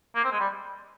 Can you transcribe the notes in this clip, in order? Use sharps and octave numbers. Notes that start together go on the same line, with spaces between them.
A#3
C4
G#3
G3